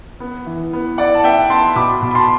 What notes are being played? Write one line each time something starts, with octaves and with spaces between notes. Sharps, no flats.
B3
E3
B3
E4 D5 F#5
A5
B3 E5 G5
B3 A5 C6
B2 B5 D6
B2
B5
A5 C6